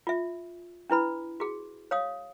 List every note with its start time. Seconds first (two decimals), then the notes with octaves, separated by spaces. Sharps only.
0.07 F4 E5
0.90 D4 E4 B4 B5
1.40 F#4 G#4
1.91 C#5 F5 D#6